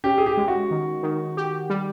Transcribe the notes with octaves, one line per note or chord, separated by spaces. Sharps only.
C#4 G4
G#4
G4
G#3
F#4
D#3
D#3
G4
G3